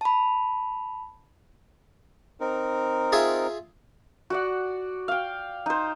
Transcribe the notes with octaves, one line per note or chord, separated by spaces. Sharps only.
A5 B5
C4 D#4 A#4
F4 G#4 E5
F#4 D5 F#5
F5 G5
D#4 C5